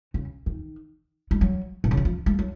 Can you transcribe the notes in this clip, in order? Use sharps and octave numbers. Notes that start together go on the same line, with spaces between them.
C#3
D#3
G#3
F#3
B2
C#3
D#3
F3
G#3
F#3